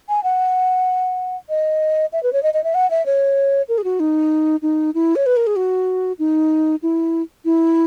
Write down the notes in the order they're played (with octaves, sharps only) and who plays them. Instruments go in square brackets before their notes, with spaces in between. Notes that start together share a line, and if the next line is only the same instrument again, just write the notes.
[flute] G#5
F#5
D#5
E5
B4
C#5
D#5
D#5
E5
F#5
E5
C#5
A#4
G#4
F#4
D#4
D#4
E4
C#5
B4
A#4
G#4
F#4
D#4
E4
E4